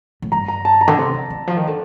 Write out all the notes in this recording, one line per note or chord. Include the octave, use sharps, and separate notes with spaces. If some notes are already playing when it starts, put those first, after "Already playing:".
A2
G2 A#5
A#5
A5
A#5
D3
C3
D3
D3
F3
D#3
D3